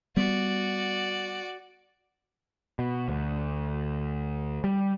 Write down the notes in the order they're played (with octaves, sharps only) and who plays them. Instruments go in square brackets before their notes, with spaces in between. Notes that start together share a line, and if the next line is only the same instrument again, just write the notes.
[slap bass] G3 B3 [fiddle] F#4 D5
[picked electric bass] B2
D2
G3